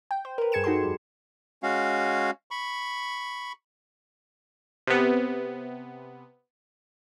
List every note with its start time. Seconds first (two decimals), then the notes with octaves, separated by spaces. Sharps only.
0.11 G5
0.25 C5
0.38 A#4 B4
0.52 G2 G#4 G#6 C#7 E7
0.64 D#4 F#4 G4 A4 C6
0.83 F2 G3
1.63 G#3 C#4 F#4 F5
2.51 B5 C#6
4.87 C3 B3